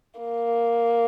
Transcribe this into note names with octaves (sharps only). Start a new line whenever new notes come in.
A#3